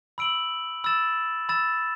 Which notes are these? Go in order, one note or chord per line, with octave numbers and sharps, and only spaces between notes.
B5 E6 D7 F#7
B5 E6 A6 E7
B5 E6 A6 E7